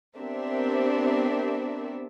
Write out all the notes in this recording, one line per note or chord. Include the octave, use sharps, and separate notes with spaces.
B3 C4 D4 G4 A#4 E5